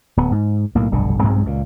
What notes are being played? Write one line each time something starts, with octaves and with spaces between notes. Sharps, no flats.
D1 B3
G#2
B1 A2 A#3
F1 B1 G2 D3
B1 G2 G#3 C4
C#2 A#2